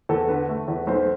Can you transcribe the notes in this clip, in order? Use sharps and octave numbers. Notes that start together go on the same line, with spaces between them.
E2 A4
D3 B4
A3
E2
B1 C5